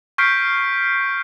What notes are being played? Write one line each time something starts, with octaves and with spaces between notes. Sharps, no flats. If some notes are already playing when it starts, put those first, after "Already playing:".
C#6 F6 G6 B6 C7 D7